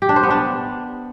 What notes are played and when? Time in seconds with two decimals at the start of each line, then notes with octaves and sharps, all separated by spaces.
0.02 G4
0.09 D4
0.16 C5
0.23 B3
0.30 D4